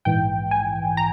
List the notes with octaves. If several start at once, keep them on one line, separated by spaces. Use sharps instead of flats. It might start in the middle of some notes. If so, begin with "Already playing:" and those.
A#1 G#2 E3 G5
G#5
A#5